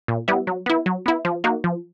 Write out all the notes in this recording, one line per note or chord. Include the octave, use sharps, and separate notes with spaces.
A#2
G3 B3 E4
F#3
B3 E4
F#3
B3 E4
F3
A#3 D#4 F#4
F3